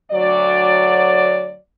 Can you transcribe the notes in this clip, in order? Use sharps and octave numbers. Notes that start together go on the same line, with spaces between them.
D2 F#3 D5